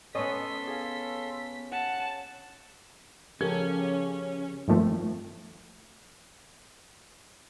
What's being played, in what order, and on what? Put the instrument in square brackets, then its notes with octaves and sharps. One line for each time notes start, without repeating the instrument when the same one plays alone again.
[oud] B3 D#5 [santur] C#4 [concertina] A4 C6 [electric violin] B6
[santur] G#4 F5
[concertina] F#5 [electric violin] A5
[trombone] C#3 [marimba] F3 [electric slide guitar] C#4 [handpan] G4 A4 A#4
[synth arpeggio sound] G2 D#3 F3 A3 C4